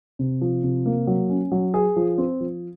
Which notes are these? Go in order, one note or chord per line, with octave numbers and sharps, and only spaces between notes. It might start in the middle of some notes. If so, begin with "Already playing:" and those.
C3
F3
C3
A#3
F#3
C#4
F#3
G#4
F3
C4
F3